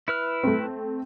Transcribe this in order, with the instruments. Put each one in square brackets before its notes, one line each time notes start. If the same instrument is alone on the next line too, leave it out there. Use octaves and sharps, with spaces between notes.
[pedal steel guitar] E4 B4 F6
[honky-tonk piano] A3 C4